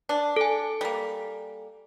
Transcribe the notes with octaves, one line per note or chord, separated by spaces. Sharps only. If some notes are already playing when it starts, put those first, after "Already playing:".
D4
A4 G#5
G3 A#3